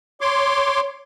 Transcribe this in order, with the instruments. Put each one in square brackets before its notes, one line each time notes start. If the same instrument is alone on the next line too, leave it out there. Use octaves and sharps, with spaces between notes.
[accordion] C#5 C6 D6